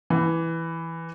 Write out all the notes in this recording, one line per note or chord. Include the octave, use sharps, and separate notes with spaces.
E3